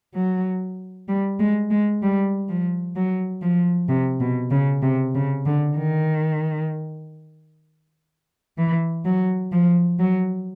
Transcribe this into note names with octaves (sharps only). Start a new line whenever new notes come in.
F#3
G3
G#3
G#3
G3
F3
F#3
F3
C3
B2
C#3
C3
C#3
D3
D#3
E3
F#3
F3
F#3